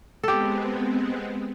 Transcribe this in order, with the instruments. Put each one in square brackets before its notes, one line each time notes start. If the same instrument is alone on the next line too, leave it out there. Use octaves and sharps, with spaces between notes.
[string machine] G#3 B3 C4 [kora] G4 A4